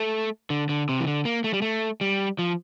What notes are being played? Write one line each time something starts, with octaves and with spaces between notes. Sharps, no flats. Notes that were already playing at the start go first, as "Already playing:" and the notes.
Already playing: A3
D3
D3
C3
E3
D3
A#3
A3
G3
A3
G3
F3